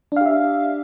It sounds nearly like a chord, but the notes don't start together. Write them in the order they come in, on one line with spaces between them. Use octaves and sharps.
D4 F5 G4 E5